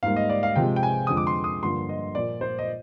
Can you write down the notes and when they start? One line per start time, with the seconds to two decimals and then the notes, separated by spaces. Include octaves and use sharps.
0.03 G#2 G3 A#3 F5
0.16 D#5
0.29 D5
0.43 F5
0.56 C3 F3 G#3 G5
0.76 G5
0.83 G#5
1.07 F2 D3 G#3 D#6
1.17 D6
1.27 C6
1.44 D#6
1.62 G2 D3 F3 A#3 C6
1.89 D#5
2.15 A#2 F3 A#3 D5
2.41 C5
2.59 D#5